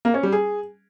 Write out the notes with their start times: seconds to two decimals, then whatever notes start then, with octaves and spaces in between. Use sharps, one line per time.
0.05 A#3
0.14 C#4
0.23 G3
0.32 G#4